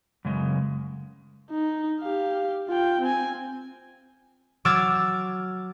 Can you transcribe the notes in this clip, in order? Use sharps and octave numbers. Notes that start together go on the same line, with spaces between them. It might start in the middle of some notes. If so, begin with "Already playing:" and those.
F#2 C#3 G#3
D#4
G4 F5
F4 G5
C4 G#5
F#3 D6 E6 F6 G#6 A6